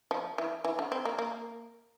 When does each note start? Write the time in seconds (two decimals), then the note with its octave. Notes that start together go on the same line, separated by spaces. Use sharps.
0.11 F3
0.38 E3
0.64 E3
0.79 D3
0.92 C4
1.05 A#3
1.19 A#3